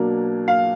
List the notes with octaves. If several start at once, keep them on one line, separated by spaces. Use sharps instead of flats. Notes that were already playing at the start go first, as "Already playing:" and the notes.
Already playing: B2 F#3 A#3 D4
F5